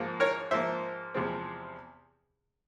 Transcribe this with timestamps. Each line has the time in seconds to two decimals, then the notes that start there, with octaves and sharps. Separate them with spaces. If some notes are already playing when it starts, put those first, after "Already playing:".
Already playing: G#2 F3 A#3
0.20 A#4 C#5
0.51 G#2 F3 A#3 C5 E5
1.14 E2 C3 F3 G#3 C4